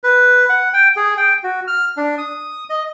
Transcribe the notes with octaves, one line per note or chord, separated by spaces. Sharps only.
B4
F#5
G5
G#4
G5
F#4
F6
D4
D#6
D#5